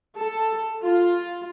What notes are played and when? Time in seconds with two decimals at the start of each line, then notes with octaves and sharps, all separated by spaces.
0.16 A4
0.82 F4